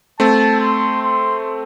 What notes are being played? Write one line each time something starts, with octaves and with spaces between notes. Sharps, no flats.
A3 C4 A5
C6
C6